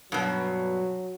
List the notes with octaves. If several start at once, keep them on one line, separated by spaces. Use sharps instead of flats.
G2 B2 F#3